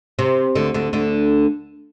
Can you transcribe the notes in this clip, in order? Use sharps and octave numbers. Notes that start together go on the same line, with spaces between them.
C3
D2 D3
D2 D3
D2 D3